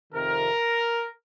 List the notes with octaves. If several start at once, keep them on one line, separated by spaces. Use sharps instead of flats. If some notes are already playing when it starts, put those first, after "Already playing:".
F2 C3 D#3 A#4